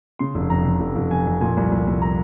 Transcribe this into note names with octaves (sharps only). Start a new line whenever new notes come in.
C#3 C6
F1
F2 A#5
F2
F1
F1
F2 G#5
F2
A#2 G#5
C2
C2
C2
A#5